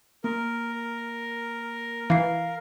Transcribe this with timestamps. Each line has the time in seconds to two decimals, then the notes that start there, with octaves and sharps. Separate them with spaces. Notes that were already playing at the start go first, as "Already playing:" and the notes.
0.24 A#3 A#4
2.10 E3 F5 C7